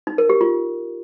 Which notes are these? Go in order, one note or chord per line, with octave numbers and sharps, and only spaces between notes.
D#4
A#4
G4
F4